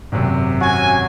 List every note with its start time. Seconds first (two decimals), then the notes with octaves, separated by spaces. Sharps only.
0.12 G#1 F#2 C3
0.61 C#4 F#4 G#5